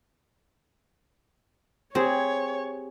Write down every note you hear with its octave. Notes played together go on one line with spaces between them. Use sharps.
C4 G4 G#4 C#5